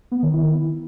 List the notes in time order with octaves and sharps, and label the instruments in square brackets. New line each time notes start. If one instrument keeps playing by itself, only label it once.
[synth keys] B3
D#3
E4